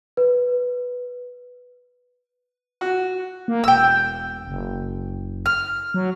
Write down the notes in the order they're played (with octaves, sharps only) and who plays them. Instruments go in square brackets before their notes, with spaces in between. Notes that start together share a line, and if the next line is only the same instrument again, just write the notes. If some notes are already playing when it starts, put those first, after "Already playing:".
[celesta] B4
[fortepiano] F#4
[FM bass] A#3
[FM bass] E1 [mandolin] G5 E6
[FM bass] F#1
[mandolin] F6
[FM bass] F#3